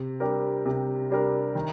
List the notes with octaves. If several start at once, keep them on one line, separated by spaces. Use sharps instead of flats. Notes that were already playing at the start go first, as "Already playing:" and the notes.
Already playing: C3
G3 D4 G4 A#4
C3
G3 D4 G4 A#4
D#3